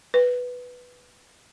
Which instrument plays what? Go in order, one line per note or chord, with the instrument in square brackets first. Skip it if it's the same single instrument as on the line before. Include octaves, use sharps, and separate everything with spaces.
[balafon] B4